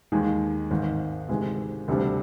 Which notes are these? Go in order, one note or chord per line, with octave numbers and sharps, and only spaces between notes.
D#2 D#3 G#3
G#1 G#2 D#3
D2 C3 D#3 G#3
D2 C3 G3 D4